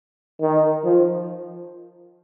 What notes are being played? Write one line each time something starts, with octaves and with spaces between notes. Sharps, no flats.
D#3
F3